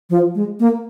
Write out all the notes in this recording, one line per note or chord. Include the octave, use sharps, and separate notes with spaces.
F3
G#3
A#3